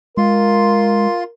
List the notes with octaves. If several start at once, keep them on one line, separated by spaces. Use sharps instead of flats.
G#3 F4 A#4 C6